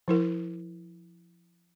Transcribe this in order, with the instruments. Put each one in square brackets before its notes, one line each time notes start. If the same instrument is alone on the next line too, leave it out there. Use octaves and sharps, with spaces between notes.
[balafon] F3 E4 A#4